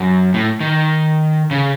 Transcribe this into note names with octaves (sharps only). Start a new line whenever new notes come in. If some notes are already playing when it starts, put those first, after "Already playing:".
Already playing: F#2
A2
D#3
C#3